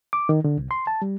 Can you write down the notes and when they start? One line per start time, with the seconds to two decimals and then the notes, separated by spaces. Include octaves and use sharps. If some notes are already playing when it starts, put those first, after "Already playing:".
0.13 D6
0.29 D#3
0.44 D3
0.58 C2
0.71 C6
0.87 A5
1.02 G3